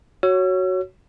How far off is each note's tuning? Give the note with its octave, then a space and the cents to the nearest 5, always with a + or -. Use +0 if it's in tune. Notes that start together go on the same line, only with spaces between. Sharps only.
F#4 +5 C#5 +0 E6 +40